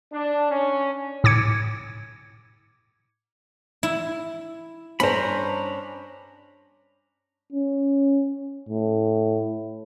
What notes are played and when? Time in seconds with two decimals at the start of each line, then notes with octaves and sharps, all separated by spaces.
0.13 D4
0.51 C#4
1.24 A2 D6 G#6 C#7
3.83 E4
5.00 G2 C#4 D4 C5 A#5 B5
7.52 C#4
8.69 A2